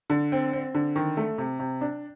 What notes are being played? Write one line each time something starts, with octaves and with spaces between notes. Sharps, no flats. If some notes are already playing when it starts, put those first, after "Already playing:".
D3
C4
C4
D3
D#3
A3
C3
C3
D4